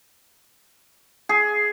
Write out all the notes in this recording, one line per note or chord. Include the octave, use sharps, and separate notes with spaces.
G#4